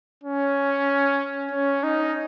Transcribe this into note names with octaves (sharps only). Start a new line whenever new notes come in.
C#4
C#4
D#4